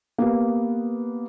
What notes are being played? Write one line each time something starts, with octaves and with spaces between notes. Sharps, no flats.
A#3 B3 G4